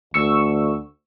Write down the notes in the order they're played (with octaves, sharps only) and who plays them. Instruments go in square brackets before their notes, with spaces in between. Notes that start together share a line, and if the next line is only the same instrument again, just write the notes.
[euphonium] D2 [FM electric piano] C#6 E6